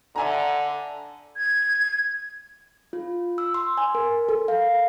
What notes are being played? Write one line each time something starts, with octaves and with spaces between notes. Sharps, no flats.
D3 E5 G#5 A#5
G#6
F4
E6
C6
G#5
A#4
A4
F5